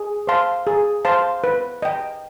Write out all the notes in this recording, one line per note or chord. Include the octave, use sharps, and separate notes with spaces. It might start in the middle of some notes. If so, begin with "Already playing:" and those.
Already playing: G#4
C5 F5 A5 C6
G#4
C5 F5 A5 C6
B4
D#5 G5